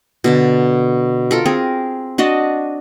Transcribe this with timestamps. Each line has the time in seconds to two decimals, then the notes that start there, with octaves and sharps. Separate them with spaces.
0.24 B2 D3 A5
1.31 F4 A4 A#4
1.46 C4 G#4 A#4
2.18 D4 F#4 D#5 A5